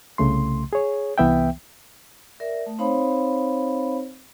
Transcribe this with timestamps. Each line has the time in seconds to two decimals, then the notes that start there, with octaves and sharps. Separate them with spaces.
0.18 C2 C#3 A3 C6
0.73 G#4 C#5
1.18 C2 E3 B3 E5 G5
2.40 A#4 D5 E5
2.66 A3
2.79 C4 D#4 C5 C#5 F5 B5